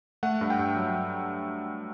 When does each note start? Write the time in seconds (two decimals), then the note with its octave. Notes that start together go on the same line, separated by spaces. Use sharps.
0.23 A3 F#5
0.41 G2
0.50 G5
0.59 G2
0.76 F#3